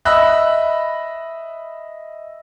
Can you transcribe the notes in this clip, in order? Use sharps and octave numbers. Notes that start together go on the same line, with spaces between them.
D#5 E5 B5 E6 F#6